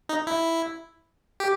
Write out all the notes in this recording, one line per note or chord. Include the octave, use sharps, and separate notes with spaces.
D#4
E4
G4